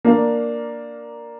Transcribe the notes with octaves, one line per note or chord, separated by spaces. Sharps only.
A#3 D4 F5